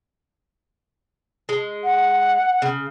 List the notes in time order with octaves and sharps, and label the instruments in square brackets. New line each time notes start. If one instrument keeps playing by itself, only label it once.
[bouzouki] G#3
[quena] F#5
[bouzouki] C#3